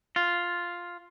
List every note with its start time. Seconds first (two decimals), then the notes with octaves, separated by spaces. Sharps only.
0.16 F4